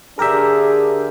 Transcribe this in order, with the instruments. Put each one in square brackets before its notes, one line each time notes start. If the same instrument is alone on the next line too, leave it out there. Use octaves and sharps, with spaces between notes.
[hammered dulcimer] D3 G4 A#5 [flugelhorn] D4 [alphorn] G#4 [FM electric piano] A#4 E5